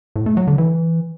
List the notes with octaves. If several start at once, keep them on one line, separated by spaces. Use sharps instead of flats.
A2
A3
F#3
D3
E3